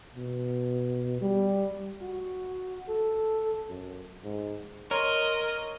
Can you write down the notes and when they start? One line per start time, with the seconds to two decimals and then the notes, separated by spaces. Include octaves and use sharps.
0.16 B2
1.21 G3
2.02 F#4
2.89 A4
3.70 F#2
4.24 G#2
4.91 A#4 C#5 D#5 A#5 C6